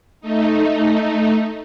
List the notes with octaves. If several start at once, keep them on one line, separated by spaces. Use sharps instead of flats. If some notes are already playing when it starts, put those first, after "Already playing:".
A3 D#4